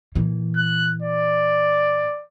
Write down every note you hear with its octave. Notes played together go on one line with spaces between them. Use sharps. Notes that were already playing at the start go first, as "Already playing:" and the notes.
A#2 E3
F#6
D5